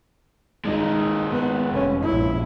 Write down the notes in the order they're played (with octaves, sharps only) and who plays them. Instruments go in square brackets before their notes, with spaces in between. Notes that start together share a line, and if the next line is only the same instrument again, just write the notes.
[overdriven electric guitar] D#2 G#3 [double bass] D#4
[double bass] B3
F1 C#4
A#1 E4